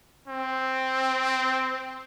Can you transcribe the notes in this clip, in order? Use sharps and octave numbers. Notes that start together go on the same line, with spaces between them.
C4